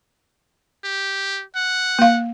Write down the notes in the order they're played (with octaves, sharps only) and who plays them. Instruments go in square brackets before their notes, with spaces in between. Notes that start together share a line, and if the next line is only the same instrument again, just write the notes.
[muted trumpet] G4
F#5
[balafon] A#3 F5